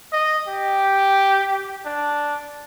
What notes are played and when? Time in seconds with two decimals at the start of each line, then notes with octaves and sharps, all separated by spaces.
0.12 D#5
0.48 G4
1.86 D4